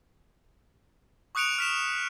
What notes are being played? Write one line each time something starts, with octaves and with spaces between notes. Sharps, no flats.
C#6 D#6 F#6 C#7 D7 F7
F6 B6 E7